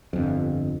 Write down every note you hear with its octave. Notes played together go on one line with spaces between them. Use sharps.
G1 F2